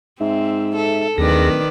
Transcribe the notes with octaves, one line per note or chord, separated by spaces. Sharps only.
G#2 C4 E5
A4
D1 D#2 D#3 G#4 B4 D5 A#6